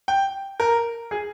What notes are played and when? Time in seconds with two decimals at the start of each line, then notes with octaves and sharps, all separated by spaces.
0.08 G5
0.60 A#4
1.11 G#4